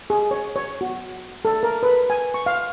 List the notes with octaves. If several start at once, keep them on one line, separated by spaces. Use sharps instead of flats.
G#4
C#5
C#5
F#4
A4
A#4
B4
G#5
C#6
F5